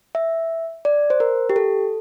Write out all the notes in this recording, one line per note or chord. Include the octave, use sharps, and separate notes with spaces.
E5
D5
C5
A#4
G4
A4